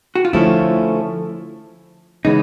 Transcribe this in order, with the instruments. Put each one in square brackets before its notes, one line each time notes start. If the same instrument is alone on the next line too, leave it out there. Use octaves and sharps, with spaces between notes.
[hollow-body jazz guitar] F#4
F4
[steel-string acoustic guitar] D3 F3 A3 C#4 [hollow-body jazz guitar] E4
[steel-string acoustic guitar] C#3 E3 G#3 B3 [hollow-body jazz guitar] D#4